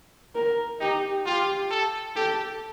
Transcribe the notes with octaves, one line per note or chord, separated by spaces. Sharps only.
A#4
D#4 G4
F4 G4
A4
G4 A4